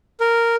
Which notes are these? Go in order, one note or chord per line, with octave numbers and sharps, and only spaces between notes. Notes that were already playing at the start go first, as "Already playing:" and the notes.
A#4